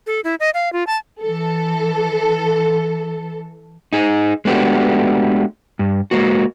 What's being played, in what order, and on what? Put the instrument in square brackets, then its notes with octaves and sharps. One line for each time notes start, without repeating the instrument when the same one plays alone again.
[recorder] A4
E4
D#5
F5
F4
A5
[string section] E3 A4
[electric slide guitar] D#4 G#4
G#3 A3 B3 D4 F#4 G4
G2
G#3 A#3 F#4